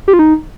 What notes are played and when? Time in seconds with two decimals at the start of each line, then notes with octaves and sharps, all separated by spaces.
0.08 G4
0.13 F4
0.19 D#4